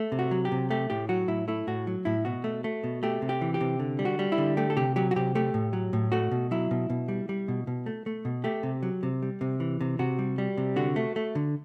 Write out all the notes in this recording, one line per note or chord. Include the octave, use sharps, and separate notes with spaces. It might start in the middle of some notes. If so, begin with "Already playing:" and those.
Already playing: A3
C3
F#4
F#3
G4
C3
A3 G4
A2 G4
F#3 F#4
A2 E4
A3 E4
A2 F#4
F#3
A2 E4
B2 F#4
A3
A3
B2
A3 G4
C3
G4
E3
G4
C3
D3
G3
F#4
G3
E4
D3
A3 G4
A4
C3 G4
F#3 G4
F#4
C3 G4
A3 G4
A2
F#3
A2
A3 F#4
B2
F#3 E4
B2
B2
G3
G3
B2
B2
A3
A3
B2
A3 G4
C3
F#3
C3
G3
C3
E3
C3
C3 F#4
G3
G3
C3
D3 F#4
A3
A3
D3